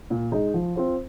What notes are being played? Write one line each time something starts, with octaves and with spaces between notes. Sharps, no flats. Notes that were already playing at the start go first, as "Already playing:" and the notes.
A#2
G#3 D#4
F3
C4 F4 C5